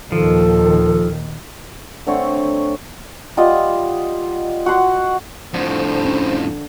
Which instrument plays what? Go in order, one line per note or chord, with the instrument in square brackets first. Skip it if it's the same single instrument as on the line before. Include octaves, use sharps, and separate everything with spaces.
[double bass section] D#2 A#2 D#3 [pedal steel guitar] F3 [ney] A4
[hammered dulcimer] D3 A3 C4 C#5
[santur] G3 F4 D#5 F#5
F#4 F#5 C6
[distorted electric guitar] F2 A2 [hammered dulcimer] D3 [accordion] C5
[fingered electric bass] C#4